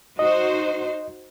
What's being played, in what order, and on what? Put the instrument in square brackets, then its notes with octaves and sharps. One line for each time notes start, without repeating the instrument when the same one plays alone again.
[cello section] D#4 F#4 C5 [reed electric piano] D#5